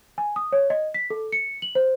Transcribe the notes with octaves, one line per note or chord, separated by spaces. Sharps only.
G#5
D#6
C#5
D#5
B6
A4
C#7
F#7
C5